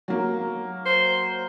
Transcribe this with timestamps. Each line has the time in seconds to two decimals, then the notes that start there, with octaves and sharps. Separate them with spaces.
0.08 F#3 A#3
0.86 C5